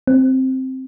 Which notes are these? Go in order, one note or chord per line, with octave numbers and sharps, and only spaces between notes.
C4